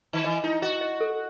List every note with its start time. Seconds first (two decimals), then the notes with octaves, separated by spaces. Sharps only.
0.13 D#3
0.24 E3 D#5
0.44 D#4 E4
0.62 F#4 D#5
0.81 D#5
1.01 A4